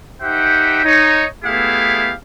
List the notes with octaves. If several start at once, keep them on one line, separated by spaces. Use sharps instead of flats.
D#4 G4 C5 E5 F#5 G5
D#4 C#5
A3 B3 E4 G4 G#4 F5